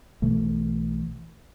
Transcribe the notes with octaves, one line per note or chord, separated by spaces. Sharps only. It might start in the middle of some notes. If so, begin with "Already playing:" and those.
B1 B2 E3 A3